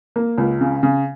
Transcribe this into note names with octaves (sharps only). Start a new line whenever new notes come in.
A#3
C#2
C#3
C#3